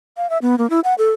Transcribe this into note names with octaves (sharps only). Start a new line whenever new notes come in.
F5
E5
B3
A#3
E4
F#5
A4